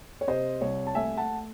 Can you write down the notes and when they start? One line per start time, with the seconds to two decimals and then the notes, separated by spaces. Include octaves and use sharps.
0.21 C#5
0.28 C3 C5 D#5
0.61 C2 C#5
0.87 A5
0.95 A3 E5 G#5
1.17 F#5 A5